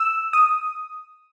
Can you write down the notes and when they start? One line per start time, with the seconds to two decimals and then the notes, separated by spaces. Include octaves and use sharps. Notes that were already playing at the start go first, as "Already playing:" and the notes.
Already playing: E6
0.33 D#6